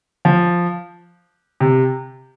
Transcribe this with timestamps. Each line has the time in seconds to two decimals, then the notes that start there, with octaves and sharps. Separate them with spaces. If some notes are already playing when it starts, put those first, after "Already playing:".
0.25 F3
1.60 C3